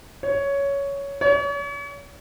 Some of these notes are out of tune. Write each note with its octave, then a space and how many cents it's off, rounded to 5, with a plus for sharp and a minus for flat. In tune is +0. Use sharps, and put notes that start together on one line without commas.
C#5 +10
C#5 +40